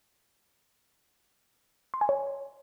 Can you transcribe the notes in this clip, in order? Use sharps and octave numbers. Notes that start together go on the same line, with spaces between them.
C6
G#5
C#5